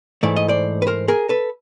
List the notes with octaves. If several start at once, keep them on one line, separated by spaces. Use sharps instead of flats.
G#2 E3 A3 D5
D#5
C5 D5
B4
A#4 C5
G#4 A#4
A4 B4